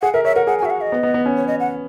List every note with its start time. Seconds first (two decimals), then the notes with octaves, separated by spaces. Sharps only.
0.02 G#4 F#5
0.14 A#4 E5
0.24 C#5 E5
0.36 A#4 F#5
0.47 G#4 F#5
0.59 G#5
0.62 F#4
0.65 E5
0.70 F#5
0.81 D#5
0.92 B3
1.03 B3
1.14 B3
1.26 C#4
1.37 C#5
1.47 D#5
1.60 F#5